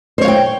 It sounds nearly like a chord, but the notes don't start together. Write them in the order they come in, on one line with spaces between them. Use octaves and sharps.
C5 C#5 F5 G5